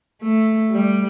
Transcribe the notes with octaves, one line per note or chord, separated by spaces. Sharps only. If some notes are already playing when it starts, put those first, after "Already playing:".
A3
G3